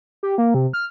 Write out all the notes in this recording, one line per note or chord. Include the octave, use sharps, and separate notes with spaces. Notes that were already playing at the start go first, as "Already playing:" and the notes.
G4
A#3
C3
F6